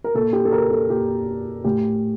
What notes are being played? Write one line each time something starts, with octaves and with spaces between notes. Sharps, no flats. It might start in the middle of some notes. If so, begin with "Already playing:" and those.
A#4
A#2 A4
G4
A4
A#4
A4
A#2 G4
A2 G4